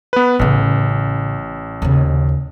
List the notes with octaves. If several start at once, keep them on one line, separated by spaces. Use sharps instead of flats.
B3 B4
A1 A2 C#3
D#2 C#3